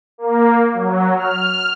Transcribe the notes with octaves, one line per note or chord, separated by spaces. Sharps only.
A#3
F#3
F6